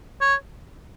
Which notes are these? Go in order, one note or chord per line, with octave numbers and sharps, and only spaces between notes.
C#5